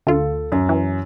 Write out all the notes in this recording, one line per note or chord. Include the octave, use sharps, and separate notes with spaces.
D2 F4 A4
F#2
E3